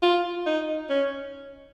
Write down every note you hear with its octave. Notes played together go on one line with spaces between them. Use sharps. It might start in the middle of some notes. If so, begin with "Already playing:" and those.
F4
D#4
C#4